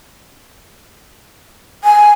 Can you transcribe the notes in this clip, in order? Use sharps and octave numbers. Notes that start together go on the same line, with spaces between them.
G#5